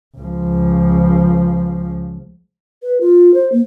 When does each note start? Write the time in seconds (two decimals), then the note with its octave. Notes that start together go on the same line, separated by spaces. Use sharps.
0.18 C#2 F3
2.83 B4
3.01 F4
3.34 C5
3.52 A#3